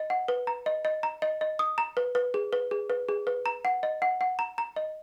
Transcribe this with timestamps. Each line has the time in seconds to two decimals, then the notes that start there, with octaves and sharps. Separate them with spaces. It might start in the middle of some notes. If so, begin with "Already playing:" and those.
Already playing: D#5
0.10 F#5
0.28 B4
0.47 A#5
0.66 D#5
0.85 D#5
1.03 A#5
1.22 D#5
1.41 D#5
1.59 D#6
1.78 A#5
1.97 B4
2.15 B4
2.34 G#4
2.53 B4
2.71 G#4
2.90 B4
3.09 G#4
3.27 B4
3.46 A#5
3.65 F#5
3.83 D#5
4.02 F#5
4.21 F#5
4.39 A#5
4.58 A#5
4.76 D#5